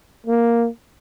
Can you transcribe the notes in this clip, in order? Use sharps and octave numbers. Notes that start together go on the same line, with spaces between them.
A#3